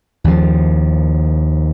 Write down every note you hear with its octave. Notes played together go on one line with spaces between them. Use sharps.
D#2 F3